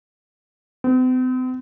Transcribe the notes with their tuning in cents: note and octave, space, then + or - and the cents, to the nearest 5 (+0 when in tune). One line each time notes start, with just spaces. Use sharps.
C4 -45